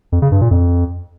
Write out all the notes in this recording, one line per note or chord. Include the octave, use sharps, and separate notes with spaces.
F2
C#3
G2
A#2
F2